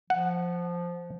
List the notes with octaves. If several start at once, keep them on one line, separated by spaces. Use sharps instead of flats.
F3 F#5